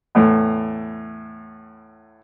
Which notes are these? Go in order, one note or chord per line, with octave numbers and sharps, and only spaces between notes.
E2 A2